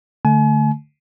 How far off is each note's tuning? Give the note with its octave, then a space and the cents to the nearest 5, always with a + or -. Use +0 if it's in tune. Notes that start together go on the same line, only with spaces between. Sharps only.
D3 +0 A3 +0 G#5 +40